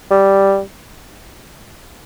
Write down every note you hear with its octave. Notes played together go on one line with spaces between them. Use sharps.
G3